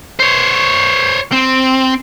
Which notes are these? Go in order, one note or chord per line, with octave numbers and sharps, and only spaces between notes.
C5 C#5
C4